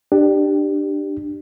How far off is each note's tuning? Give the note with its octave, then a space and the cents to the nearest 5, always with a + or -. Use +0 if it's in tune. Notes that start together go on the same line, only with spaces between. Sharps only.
D4 +20 G4 +0